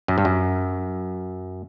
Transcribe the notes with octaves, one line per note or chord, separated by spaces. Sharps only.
F#2
G2
F#2